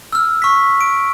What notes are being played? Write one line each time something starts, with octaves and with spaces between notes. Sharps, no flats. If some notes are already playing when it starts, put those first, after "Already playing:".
E6 F6
C#6 B6
D7